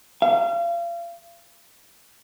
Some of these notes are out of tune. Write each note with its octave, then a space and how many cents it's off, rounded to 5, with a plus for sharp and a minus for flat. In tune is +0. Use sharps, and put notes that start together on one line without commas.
F5 -35